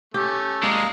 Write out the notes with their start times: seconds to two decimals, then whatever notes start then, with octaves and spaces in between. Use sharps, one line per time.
0.14 A3 C#4 G4
0.63 D#2 G#3 D5 D#5 F5 A#5